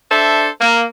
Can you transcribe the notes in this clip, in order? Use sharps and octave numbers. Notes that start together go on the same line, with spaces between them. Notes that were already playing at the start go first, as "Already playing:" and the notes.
D4 A4 C5 E5
A#3